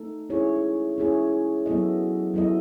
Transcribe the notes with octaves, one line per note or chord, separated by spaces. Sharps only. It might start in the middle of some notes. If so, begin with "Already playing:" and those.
Already playing: A3 D#4 A4
C#4 E4 G#4 C#5
C#4 E4 G#4 C#5
F#3 B3 E4 A4 D#5
F#3 B3 E4 A4 D#5